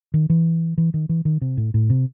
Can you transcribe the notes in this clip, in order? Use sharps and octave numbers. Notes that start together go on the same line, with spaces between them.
D#3
E3
E3
D#3
E3
D#3
C3
A2
A2
C3